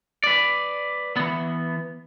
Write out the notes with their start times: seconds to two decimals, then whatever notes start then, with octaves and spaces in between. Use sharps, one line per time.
0.24 B4 D5
1.17 E3 B3